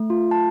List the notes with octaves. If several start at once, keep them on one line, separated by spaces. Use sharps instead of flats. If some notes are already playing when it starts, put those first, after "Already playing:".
Already playing: A3
F4
A5